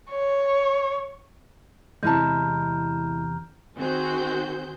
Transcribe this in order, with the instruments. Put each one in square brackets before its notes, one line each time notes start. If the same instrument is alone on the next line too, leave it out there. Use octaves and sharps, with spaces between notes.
[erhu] C#5
[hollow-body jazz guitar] E2 C3 [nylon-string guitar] G#3 E4 A5 [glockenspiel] A#5 F6 G6
[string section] D#3 C4 F#4 G#4 C5 G6